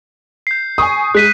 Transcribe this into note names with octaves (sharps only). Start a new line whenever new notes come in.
G6 C7
G#5 C#6 D#6
G#3 F#6 B6 D#7